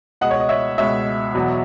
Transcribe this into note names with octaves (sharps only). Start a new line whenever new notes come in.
C#2 B2 G#3 D#5 F#5
C#5
D#5
C#5 E5
C#2 B2 G#3 C#5 E5
E2 B2 F#3